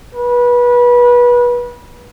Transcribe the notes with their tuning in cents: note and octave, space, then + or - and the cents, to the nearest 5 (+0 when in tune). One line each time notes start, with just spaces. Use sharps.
B4 -25